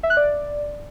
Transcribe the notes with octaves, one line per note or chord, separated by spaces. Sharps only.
E5
F#6
D5